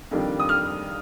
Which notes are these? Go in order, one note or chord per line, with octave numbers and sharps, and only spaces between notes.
F2 D#3 G3 D4
D#6
F6